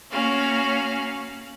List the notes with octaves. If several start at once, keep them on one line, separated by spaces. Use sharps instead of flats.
A#3 C#4 F#4 F5